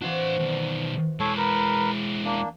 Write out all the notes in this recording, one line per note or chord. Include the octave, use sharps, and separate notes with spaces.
E3 C4 D4 F#4 F5
B2 D#3
G#3 E4 A4 C#5
A#4 B4
A#3 D4